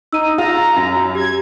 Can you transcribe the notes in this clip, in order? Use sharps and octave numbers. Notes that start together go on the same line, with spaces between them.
D#4 E6 D#7
F4 A#5
F#2
G4 G#6